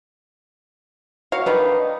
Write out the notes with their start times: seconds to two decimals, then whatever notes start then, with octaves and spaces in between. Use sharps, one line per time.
1.32 F#4 C#5 F5
1.46 D#3 D4 D#4 B4